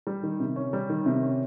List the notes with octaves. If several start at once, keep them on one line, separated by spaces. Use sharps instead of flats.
G3
D#3
C3
C#4
G3
D#3
C3
C#4